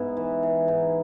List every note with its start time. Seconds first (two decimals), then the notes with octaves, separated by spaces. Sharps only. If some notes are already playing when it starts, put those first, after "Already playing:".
Already playing: G#2 B3 E4
0.17 E3
0.43 E3
0.68 G#2